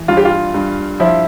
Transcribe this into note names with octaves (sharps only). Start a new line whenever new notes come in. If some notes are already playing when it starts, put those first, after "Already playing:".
Already playing: E3
G2 F4
G4
F4
G2
F3 E4